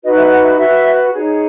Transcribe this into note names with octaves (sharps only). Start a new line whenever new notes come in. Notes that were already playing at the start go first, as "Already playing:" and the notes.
D#4 F#4 B4 D#5
E5
F#5
E5
D#5
F#4 B4 E5
D#4 G#4 C#5